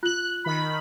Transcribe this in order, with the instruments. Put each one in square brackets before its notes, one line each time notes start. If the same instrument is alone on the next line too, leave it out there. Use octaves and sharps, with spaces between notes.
[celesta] F4 F#7 [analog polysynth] F#6
[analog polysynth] D#3 B5